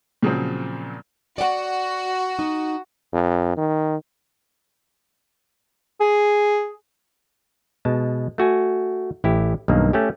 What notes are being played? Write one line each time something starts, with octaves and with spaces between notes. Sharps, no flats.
A#2 C#3 F3 F#3 C4
F#4 D5 F#5
D#4
F2
D#3
G#4
B2 G#3 A5
A3 F#4 G#5
A1 E4 G4
B1 G2 D#3 A#3
A3 C#4 G4